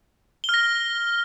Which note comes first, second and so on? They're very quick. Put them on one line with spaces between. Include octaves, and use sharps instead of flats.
G7 F6 A#6